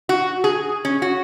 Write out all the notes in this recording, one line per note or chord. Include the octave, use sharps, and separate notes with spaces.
F#4
G#4
C#4
F#4